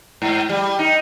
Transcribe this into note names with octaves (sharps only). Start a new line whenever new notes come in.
G#2
G3
D#4